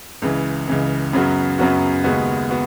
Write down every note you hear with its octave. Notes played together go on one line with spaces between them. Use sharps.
C#2 C#3 E3
C#2 C#3 E3
F#2 C#3 F#3 B3 F#4
F#2 C#3 F#3 B3 F#4
D#2 C#3 G#3 B3 F#4
B3 F#4